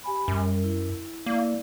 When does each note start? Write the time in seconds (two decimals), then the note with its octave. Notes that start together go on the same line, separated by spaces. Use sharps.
0.04 G4 G#5 B5
0.28 F#2 G3
0.64 E4
1.26 A#3 E4 D5